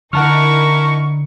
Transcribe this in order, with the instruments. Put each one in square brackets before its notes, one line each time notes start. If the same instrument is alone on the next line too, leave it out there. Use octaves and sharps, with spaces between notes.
[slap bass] D3 [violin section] D#4 E4 A#4 [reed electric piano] F#5 A5 F6 [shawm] C#6